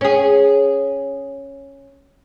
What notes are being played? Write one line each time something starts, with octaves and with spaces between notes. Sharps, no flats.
C#4 G#4